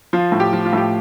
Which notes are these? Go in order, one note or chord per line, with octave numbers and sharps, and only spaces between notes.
F3 F4
A2
G4
F3
F4
A2 G4